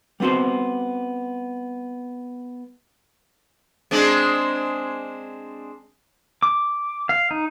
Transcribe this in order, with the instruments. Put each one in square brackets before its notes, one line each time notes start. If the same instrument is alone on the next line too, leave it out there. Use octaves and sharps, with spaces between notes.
[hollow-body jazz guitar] G3 B3 C4 F#4 C5
[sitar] G#3 C4 D4
[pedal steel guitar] D6
F5
D#4